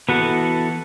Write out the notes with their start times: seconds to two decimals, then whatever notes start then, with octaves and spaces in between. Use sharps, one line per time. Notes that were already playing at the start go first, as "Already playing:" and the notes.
0.09 E3 B3 F#4 A4